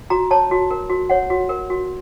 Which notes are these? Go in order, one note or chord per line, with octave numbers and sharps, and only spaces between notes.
F#4 A#5
C#5 A5
F#4
A#4
F#4
C#5 F#5
F#4
A#4
F#4